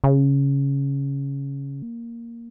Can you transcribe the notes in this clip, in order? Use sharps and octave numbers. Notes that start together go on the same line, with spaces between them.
C#3
A#3